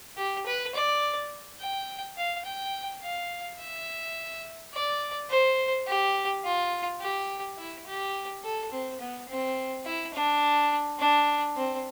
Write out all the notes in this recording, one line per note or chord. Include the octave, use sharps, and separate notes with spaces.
G4
B4
D5
G5
F5
G5
F5
E5
D5
C5
G4
F4
G4
E4
G4
A4
C4
B3
C4
E4
D4
D4
C4